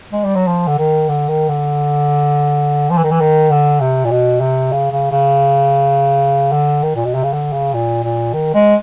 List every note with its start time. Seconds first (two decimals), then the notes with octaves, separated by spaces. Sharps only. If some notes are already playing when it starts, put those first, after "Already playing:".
0.12 G#3
0.24 G3
0.35 F#3
0.48 F3
0.67 D3
0.78 D#3
1.09 D3
1.28 D#3
1.49 D3
2.90 F3
2.97 E3
3.04 D#3
3.11 E3
3.20 D#3
3.51 D3
3.80 C3
4.05 A#2
4.10 B2
4.40 C3
4.72 C#3
4.91 C#3
5.11 C#3
6.52 D3
6.83 D#3
6.96 A#2
7.05 B2
7.14 C3
7.23 C#3
7.33 D3
7.53 C#3
7.73 A#2
8.04 A#2
8.34 D#3
8.54 G#3